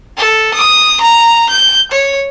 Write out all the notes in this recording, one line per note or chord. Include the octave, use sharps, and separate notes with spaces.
A4
D#6
A#5
G6
C#5